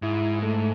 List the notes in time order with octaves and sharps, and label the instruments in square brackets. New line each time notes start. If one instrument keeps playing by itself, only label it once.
[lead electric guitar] G#2 [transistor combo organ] E4
[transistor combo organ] A3